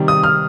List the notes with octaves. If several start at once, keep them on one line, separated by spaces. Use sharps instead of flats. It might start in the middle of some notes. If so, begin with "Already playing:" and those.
Already playing: C3 D#3 G3
D#6
F6